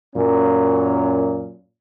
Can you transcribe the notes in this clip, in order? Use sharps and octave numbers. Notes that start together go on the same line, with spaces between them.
F#2 A#2 C#4